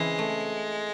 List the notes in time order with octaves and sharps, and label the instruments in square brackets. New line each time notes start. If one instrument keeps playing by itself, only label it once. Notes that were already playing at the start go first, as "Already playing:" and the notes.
Already playing: [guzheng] C#3 E3 C4 [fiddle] G#3
[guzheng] A3